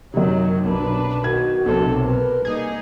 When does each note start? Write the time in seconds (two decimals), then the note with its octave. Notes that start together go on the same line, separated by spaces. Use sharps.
0.14 F#2 C3 D#3 F#3
0.65 B1 D4 B4
1.24 D#3 F#4 G#6
1.66 B1 C3 A4
2.05 A#4 B4
2.45 G3 A#3 D#4 G#4